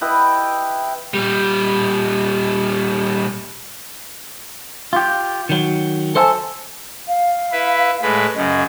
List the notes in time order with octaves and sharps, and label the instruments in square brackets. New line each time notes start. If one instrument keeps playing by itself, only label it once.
[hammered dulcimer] E4 G4 B4 D#5
[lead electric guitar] A#2 G3
[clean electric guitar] F4 G4
D#3 F#3
A4 C5 E5 G#5 A5
[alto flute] F5
[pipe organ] E4 B4
A2 G#3 B4
[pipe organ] F#2 C#3 [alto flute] D#5